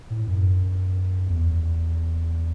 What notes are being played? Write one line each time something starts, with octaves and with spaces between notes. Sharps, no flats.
A2
F#2
E2